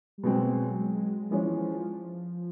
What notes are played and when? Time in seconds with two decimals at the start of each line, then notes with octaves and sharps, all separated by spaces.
0.18 G3
0.23 B2 F#3 G#3 C4
0.51 F#3
0.78 G#3
1.31 E3 F3 G#3 C#4
1.58 F3